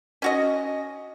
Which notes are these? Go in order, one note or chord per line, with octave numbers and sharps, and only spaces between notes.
C#4 F#4 D#5